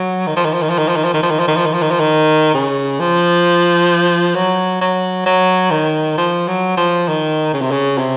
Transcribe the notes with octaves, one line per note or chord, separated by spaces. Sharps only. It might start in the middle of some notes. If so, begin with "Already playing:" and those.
Already playing: F#3
D#3
F3
D#3
F3
D#3
F3
D#3
F3
D#3
F3
D#3
F3
D#3
F3
D#3
F3
D#3
F3
D#3
F3
D#3
C#3
F3
F#3
F#3
F#3
D#3
F3
F#3
F3
D#3
C#3
C3
C#3
C3